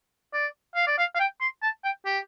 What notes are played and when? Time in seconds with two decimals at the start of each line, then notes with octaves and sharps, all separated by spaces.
0.34 D5
0.75 F5
0.87 D5
0.98 F5
1.15 F5
1.20 G5
1.41 C6
1.63 A5
1.84 G5
2.06 G4